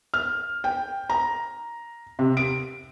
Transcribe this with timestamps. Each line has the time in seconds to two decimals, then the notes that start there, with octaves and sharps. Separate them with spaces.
0.14 F6
0.64 G5
1.10 A#5
2.19 C3
2.37 D7